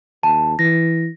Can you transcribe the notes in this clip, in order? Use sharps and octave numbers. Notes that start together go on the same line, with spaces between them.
D#2 A5
E3 A#6